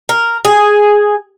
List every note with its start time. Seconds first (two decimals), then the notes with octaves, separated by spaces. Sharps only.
0.09 A#4
0.45 G#4